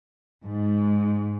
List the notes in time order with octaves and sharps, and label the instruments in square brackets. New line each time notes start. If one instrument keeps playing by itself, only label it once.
[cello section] G#2